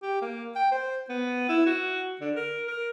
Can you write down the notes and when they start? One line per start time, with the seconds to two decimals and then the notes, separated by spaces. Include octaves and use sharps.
0.02 G4
0.22 A#3
0.56 G5
0.72 C5
1.09 B3
1.49 E4
1.66 F#4
2.21 D3
2.36 A#4
2.68 A#4